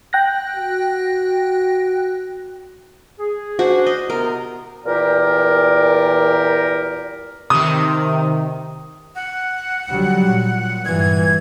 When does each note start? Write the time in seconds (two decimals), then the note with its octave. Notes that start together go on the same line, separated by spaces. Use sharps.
0.13 G5 F#6 A#6
0.56 F#4
3.19 G#4
3.59 C#4 D4 F#4 C5
3.86 D#5
4.10 C3 B3 A#4
4.85 E2 A#2 G4 A#4 D5
7.50 C3 D#3 D#6
9.15 F#5
9.89 D3 F#3 G3
10.26 A#2
10.85 G2 E3 G#6